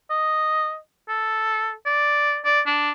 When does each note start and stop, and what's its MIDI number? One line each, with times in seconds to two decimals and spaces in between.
0.10 0.78 75
1.09 1.73 69
1.86 2.40 74
2.45 2.61 74
2.66 2.91 62